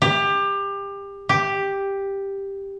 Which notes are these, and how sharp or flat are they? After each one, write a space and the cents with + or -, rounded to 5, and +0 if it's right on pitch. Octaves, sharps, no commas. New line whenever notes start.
G4 +25
G4 +5